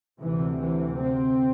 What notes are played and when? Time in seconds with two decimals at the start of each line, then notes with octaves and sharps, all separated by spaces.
0.21 D2 C3 E3
0.60 E3
1.00 C4